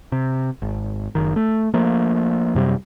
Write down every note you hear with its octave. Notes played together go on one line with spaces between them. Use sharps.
C3
G#1
F#1 D#3
A3
F3 A3 A#3
F#2 C3 G3